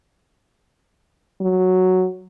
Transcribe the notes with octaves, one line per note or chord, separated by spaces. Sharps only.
F#3